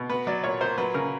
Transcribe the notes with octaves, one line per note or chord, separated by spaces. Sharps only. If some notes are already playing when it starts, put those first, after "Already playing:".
Already playing: B2
B3 B4
F#3 D5
A#2 C#5
A#2 C5
F#3 B4
C#3 A#4